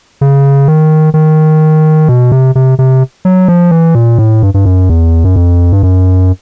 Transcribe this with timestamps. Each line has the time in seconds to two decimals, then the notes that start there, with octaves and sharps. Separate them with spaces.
0.21 C#3
0.68 D#3
1.14 D#3
2.09 B2
2.32 C3
2.55 C3
2.79 C3
3.25 F#3
3.48 F3
3.71 E3
3.95 A#2
4.18 A2
4.43 G2
4.54 G2
4.65 F#2
4.90 E2
5.24 F#2
5.36 F2
5.72 G2
5.83 F#2